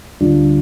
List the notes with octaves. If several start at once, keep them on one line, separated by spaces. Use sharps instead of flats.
D2 D3 G3 D4 F4